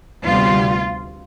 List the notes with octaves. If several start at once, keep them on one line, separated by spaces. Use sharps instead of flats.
D2 C3 G3 B3 F4